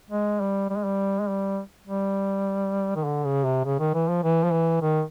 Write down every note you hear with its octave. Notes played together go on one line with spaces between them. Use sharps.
G#3
G3
G3
G#3
G3
G#3
G3
G3
D#3
D3
C#3
C3
C#3
D#3
E3
F3
E3
F3
E3
D#3